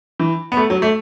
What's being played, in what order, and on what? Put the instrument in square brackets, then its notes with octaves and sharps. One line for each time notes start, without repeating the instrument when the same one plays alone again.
[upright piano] E3
B3
A3
F#3
A3